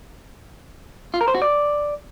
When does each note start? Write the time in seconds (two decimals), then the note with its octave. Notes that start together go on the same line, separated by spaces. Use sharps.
1.14 F4
1.21 A#4
1.28 C5
1.35 F#4
1.42 D5